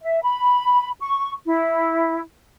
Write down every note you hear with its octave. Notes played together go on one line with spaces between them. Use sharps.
E5
B5
C#6
E4